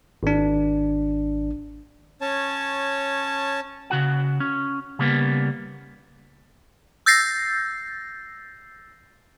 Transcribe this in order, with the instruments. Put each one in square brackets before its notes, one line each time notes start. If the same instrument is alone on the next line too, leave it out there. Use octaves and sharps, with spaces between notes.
[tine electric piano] G#1 D4
[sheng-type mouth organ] C#4 C#5 A5
[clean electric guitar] C#3 F#4 F#5
C#4
C#3 G3 A#3 B3
[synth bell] E6 G6 A6 A#6 C7